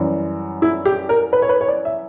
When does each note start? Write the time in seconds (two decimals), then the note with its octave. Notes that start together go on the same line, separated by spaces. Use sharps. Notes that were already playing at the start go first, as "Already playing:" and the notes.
Already playing: F#2 E3 G3
0.62 E4
0.86 G4
1.09 A#4
1.33 B4
1.42 C#5
1.49 B4
1.61 C#5
1.68 D5
1.85 E5